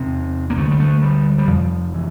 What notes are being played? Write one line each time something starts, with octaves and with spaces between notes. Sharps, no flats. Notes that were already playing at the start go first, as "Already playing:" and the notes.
Already playing: E2 C3 C4
A#3
D2 D3 A3
G3
A3
G3
G3
F2 C3 F3
E3